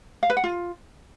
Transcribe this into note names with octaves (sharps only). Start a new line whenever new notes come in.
F5
B4
F#5
F4